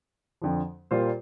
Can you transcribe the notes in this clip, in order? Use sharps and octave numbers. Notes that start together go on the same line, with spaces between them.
F2 D3 F3
A#2 G3 A#3 F4 C5